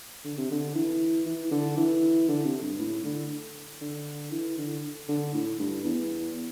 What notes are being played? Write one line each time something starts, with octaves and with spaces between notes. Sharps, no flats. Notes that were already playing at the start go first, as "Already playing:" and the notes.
D3
C3
D3
E3
E3
D3
E3
D3
C3
G2
A2
D3
D3
E3
D3
D3
A2
G2
E2